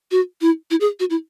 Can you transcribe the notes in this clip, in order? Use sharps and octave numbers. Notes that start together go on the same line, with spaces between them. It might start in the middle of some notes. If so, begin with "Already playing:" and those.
F#4
E4
E4
G#4
F#4
E4